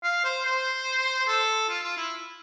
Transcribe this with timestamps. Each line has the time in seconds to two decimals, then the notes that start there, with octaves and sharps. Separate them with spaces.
0.04 F5
0.25 C5
0.46 C5
1.27 A4
1.69 F4
1.83 F4
1.97 E4